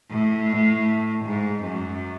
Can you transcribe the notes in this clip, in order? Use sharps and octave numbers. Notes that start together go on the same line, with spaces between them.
A2
G#2
F#2